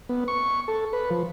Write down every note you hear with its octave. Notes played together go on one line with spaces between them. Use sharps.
B3
C#6
A4
B4
F3